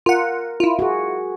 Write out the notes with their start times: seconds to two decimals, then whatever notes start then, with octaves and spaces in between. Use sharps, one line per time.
0.06 F4 A#4 F#5
0.60 E4 F4
0.79 F#4 G#4